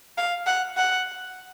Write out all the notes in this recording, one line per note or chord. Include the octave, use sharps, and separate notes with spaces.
F5
F#5
F#5